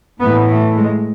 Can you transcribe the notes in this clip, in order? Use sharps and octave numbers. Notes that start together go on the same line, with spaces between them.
A2 E3 B3
A3
G#3